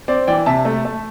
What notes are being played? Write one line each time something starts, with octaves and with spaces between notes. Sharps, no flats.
C4 D5
E3 D5 G5
C3 E5 A5
A3
A3